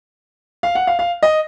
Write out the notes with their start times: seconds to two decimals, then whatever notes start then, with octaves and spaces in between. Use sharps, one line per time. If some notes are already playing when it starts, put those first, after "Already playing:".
0.63 F5
0.75 F#5
0.87 F5
0.99 F5
1.23 D#5